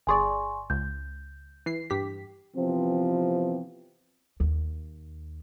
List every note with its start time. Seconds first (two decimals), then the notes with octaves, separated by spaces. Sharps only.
0.07 G1 G#4 D5 G#5 C6 C#6
0.70 C#2 G6
1.66 E3 C7
1.90 G2 G4 B6
2.57 C3 E3 F3 B3 C4
4.40 D#2